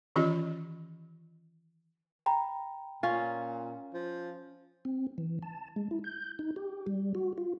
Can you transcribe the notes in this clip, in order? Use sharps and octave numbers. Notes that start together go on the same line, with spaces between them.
D#3 E3 C#4 F4 G4 D#5
G5 A#5 B5
A#2 C#4 F4
F3
C4
E3
A5
G#3
E4
G6
D#4
G4
G3
F#4
F4